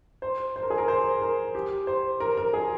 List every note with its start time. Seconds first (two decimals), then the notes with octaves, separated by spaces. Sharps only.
0.22 C5
0.56 C5
0.63 A#4
0.70 G#4
0.78 A#4
0.88 C5
1.22 A#4
1.55 G4
1.87 C5
2.20 A#4
2.37 A#4
2.53 G#4